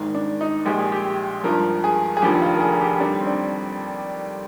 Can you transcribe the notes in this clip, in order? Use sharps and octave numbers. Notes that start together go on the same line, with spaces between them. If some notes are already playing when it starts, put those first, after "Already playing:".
Already playing: G#1 G#2 D#3
D4
D#4
A#1 A#2 G#3 G4
G#4
G4
G#1 G2 F3 A#4
G#4
G#4
F1 D#2 D3 F3 G4
F4
A#4
G#4
G#4
G4
D#2 D3 G3 D4
C4
D4